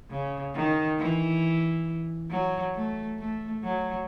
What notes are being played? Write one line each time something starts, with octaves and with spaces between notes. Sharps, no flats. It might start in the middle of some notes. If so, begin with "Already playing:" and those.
C#3
D#3
E3
F#3
A3
A3
F#3